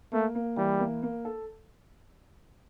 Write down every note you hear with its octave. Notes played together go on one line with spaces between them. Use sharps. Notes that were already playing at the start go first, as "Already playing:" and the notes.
A3 A#3
A#3
E3 G3
A#3
A#3
A4